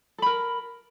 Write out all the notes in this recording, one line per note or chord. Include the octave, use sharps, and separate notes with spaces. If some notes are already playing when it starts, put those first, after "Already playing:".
A4 A#4 B5